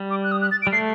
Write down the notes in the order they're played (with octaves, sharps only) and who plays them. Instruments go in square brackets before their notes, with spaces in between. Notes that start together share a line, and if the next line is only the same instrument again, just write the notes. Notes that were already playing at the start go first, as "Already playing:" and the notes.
Already playing: [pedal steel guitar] G3
[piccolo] D6
F#6
D#6
F#6
A6
D7
[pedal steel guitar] G3
[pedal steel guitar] A3 [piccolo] C7